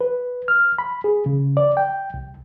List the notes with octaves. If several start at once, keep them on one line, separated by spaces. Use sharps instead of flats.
B4
F6
B5
G#4
C#3
D5
G5
C2